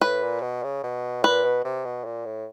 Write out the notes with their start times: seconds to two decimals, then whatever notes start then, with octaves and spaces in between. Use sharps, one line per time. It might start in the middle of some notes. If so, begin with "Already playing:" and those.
0.01 A2 B4
0.22 A#2
0.42 B2
0.63 C#3
0.83 B2
1.23 A#2 B4
1.44 B2
1.64 C3
1.85 B2
2.05 A#2
2.25 A2